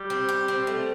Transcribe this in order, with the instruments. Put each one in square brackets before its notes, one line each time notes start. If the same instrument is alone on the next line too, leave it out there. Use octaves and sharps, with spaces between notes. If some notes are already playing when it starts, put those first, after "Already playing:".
Already playing: [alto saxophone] G3
[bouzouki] C4
G4
C4
A3